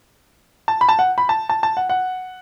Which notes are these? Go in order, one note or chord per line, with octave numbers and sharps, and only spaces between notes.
A5
B5
A5
F#5
B5
A5
A5
A5
F#5
F#5